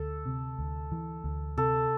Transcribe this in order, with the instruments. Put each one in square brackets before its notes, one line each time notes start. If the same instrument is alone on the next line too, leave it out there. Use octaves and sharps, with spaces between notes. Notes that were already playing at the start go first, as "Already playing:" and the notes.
Already playing: [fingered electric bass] D2 [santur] A4
[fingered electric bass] C3
D2
E3
D2
[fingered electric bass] C3 [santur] A4